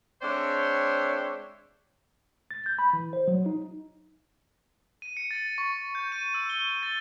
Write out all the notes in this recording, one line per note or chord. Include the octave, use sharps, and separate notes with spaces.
G#3 C4 D4 C5 C#5 E5
A6
G6
B5
E3
C5
F#3
D#4
D#7
C#7
A6
C#6
G6
D#7
E6
G7
A6